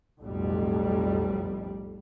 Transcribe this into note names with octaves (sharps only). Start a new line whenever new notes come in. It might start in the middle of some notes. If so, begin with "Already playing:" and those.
B1 F2 A2 G3